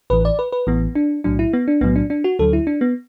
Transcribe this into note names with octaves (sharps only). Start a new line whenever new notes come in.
A1 A2 E3 B4
D5
B4
B4
A1 A2 E3 B3
D4
B1 A2 F#3 D4
E4
B3
D4
B1 A2 F#3 B3
D4
D4
F#4
D2 D3 F#3 A4
E4
D4
B3